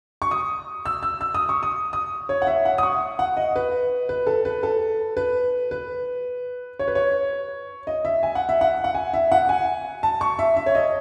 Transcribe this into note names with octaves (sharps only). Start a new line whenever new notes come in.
C#6
D#6
E6
E6
E6
D#6
C#6
D#6
D#6
C#5
F#5
E5
F#5
D#6
C#6
F#5
D#5
B4
B4
A4
B4
A4
B4
B4
C#5
B4
C#5
D#5
E5
G#5
F#5
E5
F#5
F#5
G#5
E5
F#5
G#5
A5
C#6
E5
E5
C#5
D#5